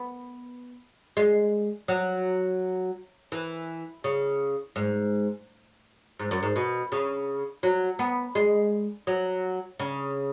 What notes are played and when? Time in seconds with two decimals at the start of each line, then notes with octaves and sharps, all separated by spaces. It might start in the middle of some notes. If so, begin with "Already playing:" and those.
Already playing: B3
1.17 G#3
1.88 F#3
3.32 E3
4.04 C#3
4.76 G#2
6.19 G#2
6.31 F#2
6.43 G#2
6.56 B2
6.92 C#3
7.63 F#3
7.99 B3
8.35 G#3
9.07 F#3
9.79 C#3